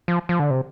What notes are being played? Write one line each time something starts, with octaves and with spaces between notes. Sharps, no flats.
F3
F3
D3
C3